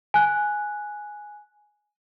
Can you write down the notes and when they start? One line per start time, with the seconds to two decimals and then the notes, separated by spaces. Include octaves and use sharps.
0.14 G#5 F#6